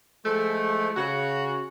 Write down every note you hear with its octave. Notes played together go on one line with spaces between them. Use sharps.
F3 G#3 A3
C#3 F#4